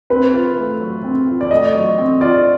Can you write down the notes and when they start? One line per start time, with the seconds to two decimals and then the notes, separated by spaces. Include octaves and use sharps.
0.10 C4 B4
0.33 F4
0.58 A3
0.80 F#3
1.04 C4
1.27 F4
1.41 D5
1.51 A3 D#5
1.75 F#3
1.98 C4
2.21 F4 D5